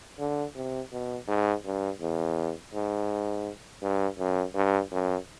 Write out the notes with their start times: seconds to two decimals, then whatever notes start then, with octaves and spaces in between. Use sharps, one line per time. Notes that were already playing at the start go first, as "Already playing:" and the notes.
0.19 D3
0.55 C3
0.92 B2
1.28 G#2
1.64 G2
2.01 E2
2.73 G#2
3.82 G2
4.18 F#2
4.54 G2
4.91 F#2